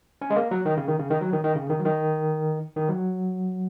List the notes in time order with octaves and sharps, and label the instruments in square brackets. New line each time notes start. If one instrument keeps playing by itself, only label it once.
[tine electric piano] C#4
G#3
A#3
F#3
D#3
C#3
D#3
C#3
D#3
F#3
D#3
D#3
C#3
D#3
F#3
D#3
D#3
F#3